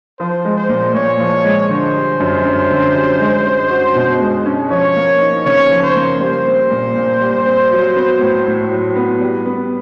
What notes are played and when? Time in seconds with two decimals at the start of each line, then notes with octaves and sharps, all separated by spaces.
0.19 F3 C5
0.45 G#3
0.57 C5
0.69 A#2
0.94 A#2 C#5
1.20 F3
1.45 G#3
1.69 D3 C5
1.95 G3
2.20 F#2
2.45 F#2
2.71 D3
2.94 G3
3.20 G#3
3.45 C#4
3.70 F#4
3.95 B2
4.20 G#3
4.46 C#4
4.70 F3 C#5
4.96 A#3
5.21 D#4
5.45 C#3 C#5
5.71 F3
5.83 C5
5.96 A#3
6.20 G3 C5
6.46 C4
6.70 A#2
6.96 A#2
7.21 G3
7.46 C4
7.71 F#3
7.95 B3
8.21 A2
8.47 A2
8.71 F#3
8.96 B3
9.21 G3
9.46 B3